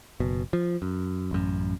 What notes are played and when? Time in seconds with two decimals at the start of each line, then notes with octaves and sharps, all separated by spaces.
0.20 F#1 B2
0.53 F3
0.82 F#2
1.31 A1 F#2